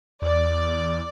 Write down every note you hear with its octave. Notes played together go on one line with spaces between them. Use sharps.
E2 D5